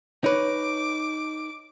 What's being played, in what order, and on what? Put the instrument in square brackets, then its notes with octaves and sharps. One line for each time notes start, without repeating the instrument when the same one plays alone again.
[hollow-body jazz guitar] D#4 B4 [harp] C#5 [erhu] D6